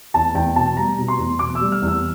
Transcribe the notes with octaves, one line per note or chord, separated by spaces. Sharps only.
E2 A5
E2 G5
B2 A5
G3 A#5
B2
C6
E2
B2 D6
E6
G3
F6
E2
E6